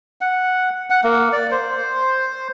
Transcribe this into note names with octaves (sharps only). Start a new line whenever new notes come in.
F#5
F#5
A#3
D5
C5